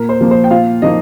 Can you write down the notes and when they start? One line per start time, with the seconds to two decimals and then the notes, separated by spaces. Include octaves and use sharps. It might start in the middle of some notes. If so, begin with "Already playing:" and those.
Already playing: A#2 A#4
0.09 C5
0.21 F3 A#3
0.31 C5
0.44 G5
0.51 A#2 F4 F5
0.82 F3 A#3 D#4 D#5